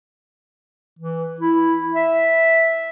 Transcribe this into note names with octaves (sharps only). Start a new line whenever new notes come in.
E3
E4
E5